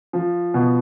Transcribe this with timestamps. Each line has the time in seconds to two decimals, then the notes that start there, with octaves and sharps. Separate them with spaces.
0.13 F3
0.54 B2